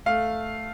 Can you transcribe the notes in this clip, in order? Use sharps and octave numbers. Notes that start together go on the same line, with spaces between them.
A3 F5